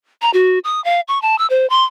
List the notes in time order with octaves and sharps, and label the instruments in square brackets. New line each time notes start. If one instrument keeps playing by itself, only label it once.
[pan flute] A#5
F#4
D#6
F5
C#6
A5
E6
C5
C6